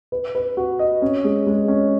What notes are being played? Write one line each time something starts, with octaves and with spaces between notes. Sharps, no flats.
B4
B4
F#4
D#5
C#4
G#3
G#3
C#4